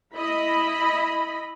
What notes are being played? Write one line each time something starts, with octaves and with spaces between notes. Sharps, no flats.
E4 D#5 B5